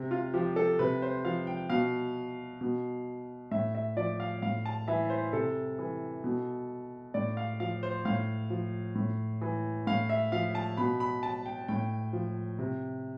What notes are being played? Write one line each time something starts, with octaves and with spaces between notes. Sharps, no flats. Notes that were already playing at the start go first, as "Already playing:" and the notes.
Already playing: C3
F4
F3 G4
A4
C3 B4
C5
F3 F5
G5
B2 F5
B2
A2 E5
E5
F3 D5
F5
A2 F5
A5
E3 E5
C5
C3 A4
E3
B2
A2 D5
F5
F3 F5
C5
A2 F5
F3
A2
E3
A2 F5
E5
F3 F5
A5
B2 B5
B5
A5
G5
A2 G5
F3
C3